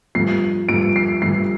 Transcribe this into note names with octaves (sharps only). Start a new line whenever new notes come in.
G2 F3 A3 C7
G2 F3 A3 D7
C7
G2 F3 A3 C7